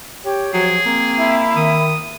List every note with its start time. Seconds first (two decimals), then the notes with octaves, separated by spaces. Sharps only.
0.25 G4 C#5 G5
0.54 F3 F#3 G#4
0.86 A#3 C4
1.18 E4 E5 B5
1.56 D#3 D#6